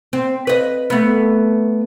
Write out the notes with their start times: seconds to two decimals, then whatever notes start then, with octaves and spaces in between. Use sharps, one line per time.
0.13 C4
0.47 B4 D#5
0.90 A3 B3